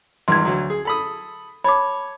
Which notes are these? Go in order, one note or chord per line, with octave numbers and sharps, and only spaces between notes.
G#1 E2 G2 C6 G#6
D2 F#3
G#4
A4 B5 D#6
C#5 A5 B5 D6